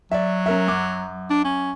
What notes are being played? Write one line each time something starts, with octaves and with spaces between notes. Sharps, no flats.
F#3 D5 E5
C#4 A#4 E5
F#2 D6
D4
C#4